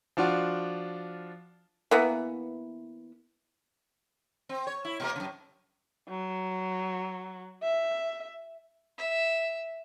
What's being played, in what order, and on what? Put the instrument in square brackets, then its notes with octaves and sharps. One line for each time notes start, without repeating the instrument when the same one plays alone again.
[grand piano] F3 D4 F4 F#4
[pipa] E3 A#3 B3
[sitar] C4
C#5
E4
B2 A#3 A#4
F#2 C#3
[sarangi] F#3
E5
[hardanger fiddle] E5